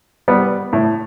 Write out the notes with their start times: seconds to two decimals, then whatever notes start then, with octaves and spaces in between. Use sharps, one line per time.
0.28 G3 B3
0.73 A2